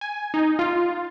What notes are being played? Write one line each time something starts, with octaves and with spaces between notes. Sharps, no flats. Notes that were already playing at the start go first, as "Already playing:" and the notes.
G#5
D#4
F4